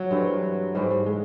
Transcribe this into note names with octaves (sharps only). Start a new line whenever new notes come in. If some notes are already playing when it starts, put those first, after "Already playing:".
Already playing: F#3
G2 E3 A3 C4
G#2 E3 G3 A3 C4
G3
G#3